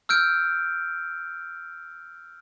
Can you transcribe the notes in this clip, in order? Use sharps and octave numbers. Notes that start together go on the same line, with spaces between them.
E6 F6 G6 D7